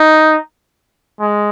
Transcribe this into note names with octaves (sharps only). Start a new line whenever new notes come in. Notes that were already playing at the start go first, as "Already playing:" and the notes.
Already playing: D#4
G#3